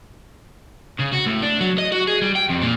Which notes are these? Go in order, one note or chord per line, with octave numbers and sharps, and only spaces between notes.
C#3
F#4
A2
D4
F#3
D#5
F#4
G#4
G3
G5
F2
A#2